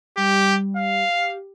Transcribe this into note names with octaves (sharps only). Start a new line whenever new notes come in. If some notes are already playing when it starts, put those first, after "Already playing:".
G3 G4
F5
G4